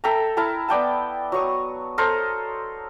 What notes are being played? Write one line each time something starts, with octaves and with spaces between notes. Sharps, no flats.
A4 E5 G5 A#5
E4 A#4 A5 A#5
B3 D5 G5 A5
F#3 C#6 D#6
A4 A#4 C5 D#5